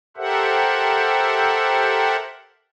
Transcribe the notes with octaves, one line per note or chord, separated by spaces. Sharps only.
G4 A4 A#4 C5 E5 F#5